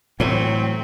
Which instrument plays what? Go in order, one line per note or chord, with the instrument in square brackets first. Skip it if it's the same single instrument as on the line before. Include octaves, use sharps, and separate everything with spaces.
[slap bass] A2 [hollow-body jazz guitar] E3 F#3 A3 [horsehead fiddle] C4